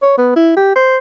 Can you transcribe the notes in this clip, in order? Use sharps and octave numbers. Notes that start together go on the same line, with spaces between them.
C#5
B3
E4
G4
C5